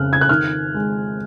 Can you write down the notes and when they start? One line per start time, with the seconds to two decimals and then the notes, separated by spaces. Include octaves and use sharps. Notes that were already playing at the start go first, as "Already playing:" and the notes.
Already playing: F2 C#3 F6 F#6
0.13 G#6
0.21 F#6
0.29 D#3 F6
0.74 G#3